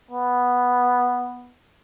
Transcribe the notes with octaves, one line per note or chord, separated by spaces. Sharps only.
B3